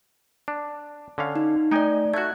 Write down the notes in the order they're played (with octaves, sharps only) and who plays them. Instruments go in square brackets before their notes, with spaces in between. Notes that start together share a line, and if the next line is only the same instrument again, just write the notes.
[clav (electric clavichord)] D4
D3 C#4 F5
[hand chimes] D#4
[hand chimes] A3 D5 [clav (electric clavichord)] D#4 G5 G#5
[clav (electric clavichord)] A3 F#4 [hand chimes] F#6 G#6